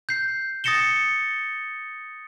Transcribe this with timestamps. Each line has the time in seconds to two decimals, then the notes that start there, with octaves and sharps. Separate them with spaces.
0.09 G6 C7
0.64 D#6 A6 A#6 C#7 E7 G7